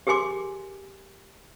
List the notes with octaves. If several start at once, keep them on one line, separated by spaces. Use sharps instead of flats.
G4 G#4 A#4 G#5 C6 D6